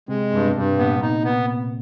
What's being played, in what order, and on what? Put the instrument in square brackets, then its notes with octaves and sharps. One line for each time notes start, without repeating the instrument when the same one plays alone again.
[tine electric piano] C3 C4 [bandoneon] G#3
[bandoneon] G2
[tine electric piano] B2 B3
[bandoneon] G2
[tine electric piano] A#2 A#3 [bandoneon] B3
[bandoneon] D#4
B3